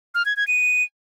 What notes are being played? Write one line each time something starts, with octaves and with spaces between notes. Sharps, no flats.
F6
G#6
G#6
D#7